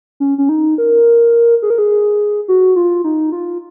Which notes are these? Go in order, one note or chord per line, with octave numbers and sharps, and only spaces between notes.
C#4
C#4
D#4
A#4
G#4
A#4
G#4
F#4
F4
D#4
F4